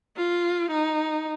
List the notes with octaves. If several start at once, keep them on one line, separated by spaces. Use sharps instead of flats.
F4
D#4